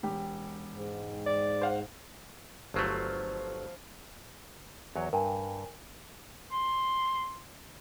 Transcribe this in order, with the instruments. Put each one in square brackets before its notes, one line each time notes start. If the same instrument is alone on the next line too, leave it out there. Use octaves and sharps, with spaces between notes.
[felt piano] E1 G4
[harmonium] G#2
[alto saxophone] D5
[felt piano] C5 F5 F#5
[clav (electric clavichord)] G1 F#3 A3 [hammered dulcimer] F3 F5
[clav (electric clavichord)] E2 F#3 C#5
[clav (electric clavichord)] G2 [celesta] A#4 G5 G#5
[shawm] C6